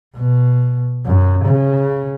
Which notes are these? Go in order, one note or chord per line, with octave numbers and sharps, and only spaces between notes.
B2
F#2
C#3